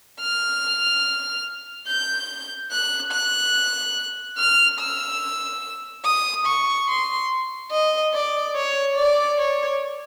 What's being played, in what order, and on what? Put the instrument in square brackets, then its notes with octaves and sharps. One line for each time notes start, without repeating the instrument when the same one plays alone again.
[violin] F6
G6
F#6
F#6
F6
E6
D#6
C#6
C6
D#5
D5
C#5
D5
C#5